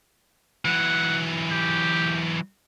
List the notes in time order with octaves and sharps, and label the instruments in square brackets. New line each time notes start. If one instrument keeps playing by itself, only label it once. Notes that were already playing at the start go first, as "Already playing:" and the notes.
[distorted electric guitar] E3 F#3 [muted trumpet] F#5
[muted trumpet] G4